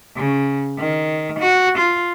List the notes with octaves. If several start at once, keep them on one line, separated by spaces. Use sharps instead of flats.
C#3
D#3
F#4
F4